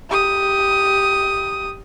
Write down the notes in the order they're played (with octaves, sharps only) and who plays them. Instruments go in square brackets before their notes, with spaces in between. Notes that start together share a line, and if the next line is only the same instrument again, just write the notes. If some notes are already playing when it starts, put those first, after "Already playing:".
[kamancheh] G4 D#6